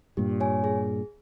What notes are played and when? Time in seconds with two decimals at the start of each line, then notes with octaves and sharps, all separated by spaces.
0.17 G2 A#2 G4
0.40 C#5 G#5
0.64 G#4